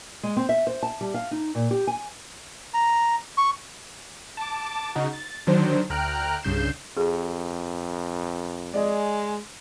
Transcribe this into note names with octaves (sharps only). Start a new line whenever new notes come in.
G#3
C4
E5
C5
A5
G3
F5
D#4
A#2
G4
G#5
A#5
C#6
A5 D6
C#3 D#4 F#4
A6
D3 D#3 F#3 D4 C5
D2 G5 A#5 F6 F#6 D7
C2 G2 C#3 G6 C7 E7
F2 G#4
G#3 D5 D#5 G#5